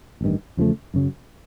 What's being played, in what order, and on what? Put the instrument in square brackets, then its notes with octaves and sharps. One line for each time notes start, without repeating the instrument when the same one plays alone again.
[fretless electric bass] A1 G2 D#3
E2 C#3 F3 A3
F#2 C#3 F#3